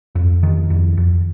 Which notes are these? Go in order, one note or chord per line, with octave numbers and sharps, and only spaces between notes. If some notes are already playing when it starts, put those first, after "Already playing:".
F2
D#3
F2
F2